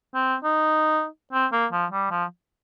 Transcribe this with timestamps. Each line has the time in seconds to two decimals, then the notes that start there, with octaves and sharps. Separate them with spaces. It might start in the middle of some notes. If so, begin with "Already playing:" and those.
0.15 C4
0.44 D#4
1.33 C4
1.53 A#3
1.72 F3
1.92 G3
2.11 F3